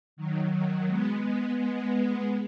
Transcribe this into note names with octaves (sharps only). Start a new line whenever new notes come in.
D#3 F#3
D#3 F#3
G#3 B3
G#3 B3
G#3 B3